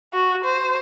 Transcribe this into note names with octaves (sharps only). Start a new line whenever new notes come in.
F#4
C5